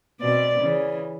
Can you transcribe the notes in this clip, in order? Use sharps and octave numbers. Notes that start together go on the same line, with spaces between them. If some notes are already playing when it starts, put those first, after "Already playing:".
B2 C4 D5
C#3 E3